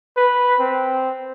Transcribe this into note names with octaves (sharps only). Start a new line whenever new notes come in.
B4
C4